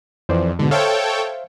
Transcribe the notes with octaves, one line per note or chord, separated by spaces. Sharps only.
F2 E3 C5 D5
G#2 B2 D3
A4 C5 C#5 E5 F5 G5